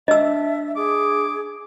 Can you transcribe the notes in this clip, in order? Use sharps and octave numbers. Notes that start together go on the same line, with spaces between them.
D4 D#5 E5 A5 E6
G#4 D6